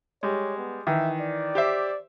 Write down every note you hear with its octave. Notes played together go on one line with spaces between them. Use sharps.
G3 G#3 C#5
B3
D#3 E3 E5
D5
G4 C5 E5